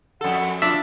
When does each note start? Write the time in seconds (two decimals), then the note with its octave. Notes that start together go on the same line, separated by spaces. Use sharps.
0.21 F2 A4 F#5
0.62 D4 F4 E5